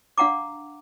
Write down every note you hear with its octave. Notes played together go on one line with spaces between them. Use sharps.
D4 F5 F#5 A#5 D6